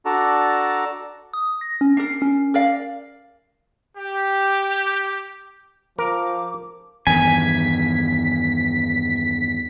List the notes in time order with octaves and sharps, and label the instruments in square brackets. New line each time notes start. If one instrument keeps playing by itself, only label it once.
[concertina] D4 F#4 A4 D5 A5 A#5
[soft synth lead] D#6
A#6
C#4
[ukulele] D4 A#4 [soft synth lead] C7
[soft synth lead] C#4
[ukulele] A#4 D5 F5
[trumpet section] G4
[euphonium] F3 [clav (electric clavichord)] A#4 [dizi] D6
[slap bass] E2 G2 D#3 [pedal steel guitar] G#5 [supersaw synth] B6